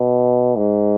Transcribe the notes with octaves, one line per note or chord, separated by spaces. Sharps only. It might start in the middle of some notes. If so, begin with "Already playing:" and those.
Already playing: B2
G#2